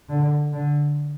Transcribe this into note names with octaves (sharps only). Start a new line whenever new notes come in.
D3
D3